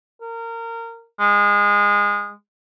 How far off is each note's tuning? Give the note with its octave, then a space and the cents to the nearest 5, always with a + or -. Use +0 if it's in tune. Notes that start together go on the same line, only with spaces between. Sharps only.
A#4 -25
G#3 -20